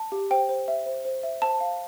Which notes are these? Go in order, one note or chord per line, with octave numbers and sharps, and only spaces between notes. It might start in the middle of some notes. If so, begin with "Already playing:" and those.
Already playing: A5
G4
C5 G5
C5
E5
C5
C5
E5
C5 A5
F5